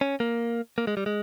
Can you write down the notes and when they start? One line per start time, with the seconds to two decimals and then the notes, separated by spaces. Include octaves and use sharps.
0.01 C#4
0.20 A#3
0.78 A#3
0.87 G#3
0.97 G3
1.06 G#3